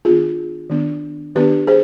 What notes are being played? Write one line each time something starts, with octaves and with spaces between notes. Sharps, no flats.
D#3 B3 D4 F4 G#4
D#3 B3 D4
D#3 B3 D4 G4 B4
G#4 C5